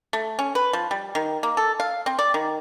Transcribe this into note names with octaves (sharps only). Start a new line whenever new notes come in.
A3
C#4
B4
F3
G3
D#3
A#3
A4
F5
C4
D5
D#3